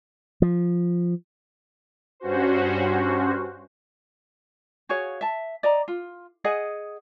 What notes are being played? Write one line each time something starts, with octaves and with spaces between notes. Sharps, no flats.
F3
G2 C#4 F#4 C5
F#4 G#4 C#5 F5
E5 A5
D5 D#5 A#5
F4
G#4 D#5 F#5